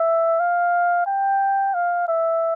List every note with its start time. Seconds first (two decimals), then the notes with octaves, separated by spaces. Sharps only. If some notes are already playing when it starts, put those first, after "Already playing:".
Already playing: E5
0.40 F5
1.07 G5
1.74 F5
2.08 E5